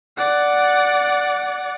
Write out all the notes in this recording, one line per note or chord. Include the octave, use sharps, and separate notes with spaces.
D5 F#5